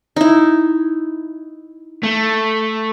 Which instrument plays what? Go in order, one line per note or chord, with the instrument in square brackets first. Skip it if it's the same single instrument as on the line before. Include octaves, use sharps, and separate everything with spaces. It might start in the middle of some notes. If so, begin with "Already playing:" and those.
[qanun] D#4 E4
[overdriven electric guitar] A3